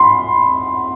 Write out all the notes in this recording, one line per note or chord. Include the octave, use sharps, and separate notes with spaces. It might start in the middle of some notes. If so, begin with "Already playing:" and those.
Already playing: B5 C6